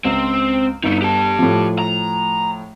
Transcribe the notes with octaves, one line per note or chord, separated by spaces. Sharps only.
C#2 C4
G1 D#4 E4
G4 A5
A2 F3
A#5